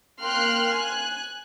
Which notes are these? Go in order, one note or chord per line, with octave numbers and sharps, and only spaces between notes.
A#3 G5 C6 F6 F#6
G#5 F#6